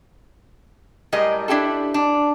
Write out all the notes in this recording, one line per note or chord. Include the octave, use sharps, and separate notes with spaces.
A2 G3 G#3 A#4 D#5
D4 E4 G4 A4
D4